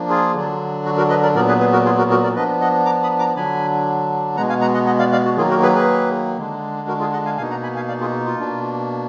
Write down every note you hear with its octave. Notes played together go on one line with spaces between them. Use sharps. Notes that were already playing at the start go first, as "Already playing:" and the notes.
Already playing: F3 A#3 D4
F4 G#4
D3 F#3 D4
F#4
F#4 A#4
B4 D#5
A#4 D5
A#2 F#3 B3 A#4 D5
G#4 B4
G#4 B4
F#4 A#4
F4 G#4
F#4 A#4
F#4 A#4
A#4 D5
F3 B3 D4 B4 D#5
D#5 F#5
A#5 D6
B5 D#6
A#5 D6
D3 F#3 D4 G#5 B5
B2 G#3 B3 F#5 A#5
F5 G#5
F#5 A#5
D#5 F#5
D#5 F#5
D5 F5
D5 F5
F#4
D#3 F#3 A#3 F4 G#4
F#4 A#4
G#4 B4
G#4 B4
D3 G#3 D4
F#4 A#4
F4 G#4
D#5 F#5
F5 G#5
B2 A#3 D#4 F5 G#5
F#5 A#5
G#5 B5
F5 G#5
D5 F5
F4 G#4
F4
B2 A#3 D4